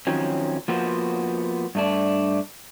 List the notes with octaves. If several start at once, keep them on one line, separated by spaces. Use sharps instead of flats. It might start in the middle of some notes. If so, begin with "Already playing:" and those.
D#3 F3 F#3 C4 C#4
F3 A#3 B3 F#4 C5
G2 A3 D4